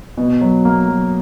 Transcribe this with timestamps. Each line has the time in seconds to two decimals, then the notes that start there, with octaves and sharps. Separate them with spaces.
0.17 B2
0.41 F#3
0.65 A#3
0.89 F#3